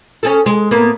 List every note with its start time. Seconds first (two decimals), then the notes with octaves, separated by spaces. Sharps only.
0.23 C#4 G#4 A4
0.46 G#3
0.71 A2 A#3 B3